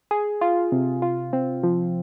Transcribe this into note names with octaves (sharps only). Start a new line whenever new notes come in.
G#4
F4
C3
F4
C4
F3